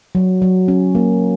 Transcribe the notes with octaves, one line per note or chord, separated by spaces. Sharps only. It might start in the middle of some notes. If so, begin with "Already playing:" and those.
F#3
F#3
C#4
A#3